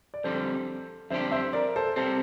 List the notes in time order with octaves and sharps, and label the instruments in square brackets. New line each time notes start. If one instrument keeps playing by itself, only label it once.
[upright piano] D5
[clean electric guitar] F2 D3 G3 [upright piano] A4 C5
[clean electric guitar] F2 D3 G3 D4 G4 [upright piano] C5 E5
[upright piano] C5 E5
A#4 D5
A4 C5
[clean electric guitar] C3 G3 C4 [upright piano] A4 C5